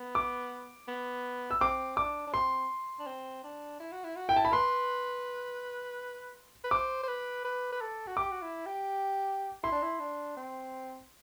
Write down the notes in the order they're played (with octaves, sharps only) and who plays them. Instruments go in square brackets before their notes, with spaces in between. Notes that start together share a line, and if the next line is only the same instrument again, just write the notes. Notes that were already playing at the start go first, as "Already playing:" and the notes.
Already playing: [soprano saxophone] B3
[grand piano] D6
[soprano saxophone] B3
[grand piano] E6
[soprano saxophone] C4 [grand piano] D6
[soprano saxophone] D4 [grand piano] D6
[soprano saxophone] D4
[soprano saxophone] C4 [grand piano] C6
[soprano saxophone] D4
C4
D4
E4
F#4
E4
F#4
[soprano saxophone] E4 [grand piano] G5
[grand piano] A5
B5
[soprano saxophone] B4 [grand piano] C6
[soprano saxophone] B4
[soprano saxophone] C5 [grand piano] D6
[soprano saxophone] C5
B4
B4
B4
A4
F#4
[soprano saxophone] G4 [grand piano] D6
[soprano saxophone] F#4
E4
G4
[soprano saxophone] E4 [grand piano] C6
[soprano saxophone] D4
E4
D4
C4